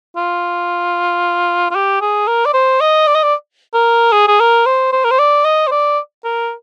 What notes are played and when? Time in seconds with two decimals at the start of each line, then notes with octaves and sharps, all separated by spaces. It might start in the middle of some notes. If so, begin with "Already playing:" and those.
0.17 F4
1.71 F4
1.75 G4
2.01 G#4
2.28 A#4
2.46 D5
2.54 C5
2.81 D#5
3.07 D5
3.15 D#5
3.23 D5
3.74 A#4
4.12 G#4
4.28 G#4
4.40 A#4
4.66 C5
4.92 C5
5.05 A#4
5.11 C5
5.19 D5
5.45 D#5
5.67 C5
5.71 D5
6.25 A#4